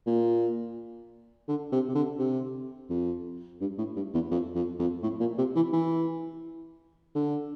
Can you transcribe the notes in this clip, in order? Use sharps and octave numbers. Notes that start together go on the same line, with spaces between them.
A#2
D3
C3
C3
D3
C3
F2
G2
A2
G2
E2
F2
F2
F2
A2
A#2
C3
E3
E3
D3